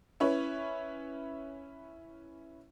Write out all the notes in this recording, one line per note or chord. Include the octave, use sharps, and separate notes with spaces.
C#4 E4 B4 C#5